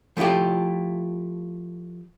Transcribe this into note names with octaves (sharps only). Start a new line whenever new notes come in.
F3 A3 E4 F4 G4